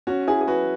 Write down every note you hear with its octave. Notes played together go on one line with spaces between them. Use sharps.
C#4 F#4
E4 G#4
G#4
F#4 B4